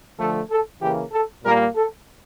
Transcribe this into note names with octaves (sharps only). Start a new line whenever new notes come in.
D3 F3 A3 A4
A4
C#3 E3 A#3 G4
A4
A#2 G3 A#3 A#4
A4